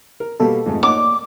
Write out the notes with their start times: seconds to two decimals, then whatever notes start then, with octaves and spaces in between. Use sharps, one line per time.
0.20 A#4
0.40 B2 G3 A#3 A4
0.66 F2 G#2 A3
0.83 A#3 D#4 C#5 F#5 D6
0.97 D5